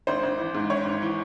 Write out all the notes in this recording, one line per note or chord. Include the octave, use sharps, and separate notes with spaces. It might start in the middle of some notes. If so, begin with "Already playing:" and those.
G#1 C5
G#1
E3
G#2
G#1 C#5
G#1
E3